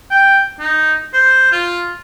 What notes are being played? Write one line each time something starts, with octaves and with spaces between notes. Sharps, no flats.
G5
D#4
C5
F4